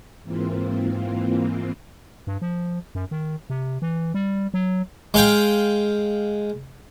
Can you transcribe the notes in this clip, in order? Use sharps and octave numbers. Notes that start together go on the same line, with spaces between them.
G#2 E3 A#3 C4 F4
G2
F3
F#2
D#3
C3
E3
G3
F#3
G#3 F5 G5